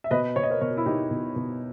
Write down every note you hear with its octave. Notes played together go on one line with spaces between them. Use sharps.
E5
B2 B4 D#5
B2 C#5
D#5
A#4 C#5
B2 A#4 C#5
E4
B2 D#4 G4
B2
B2